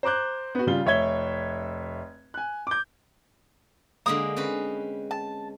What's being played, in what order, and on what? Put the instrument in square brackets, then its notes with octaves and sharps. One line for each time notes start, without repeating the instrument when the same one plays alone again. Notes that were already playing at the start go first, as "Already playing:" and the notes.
[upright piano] C5 A#5 D6 F#6 G6
B3 F#4
C#3 G3 F4 G7
F1 C#5 E5 G#6 G7
G#5 F#6
D6 G6
[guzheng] D3 G#3 A#3 [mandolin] D#6
[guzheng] C4 C#4 B4
[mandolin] A5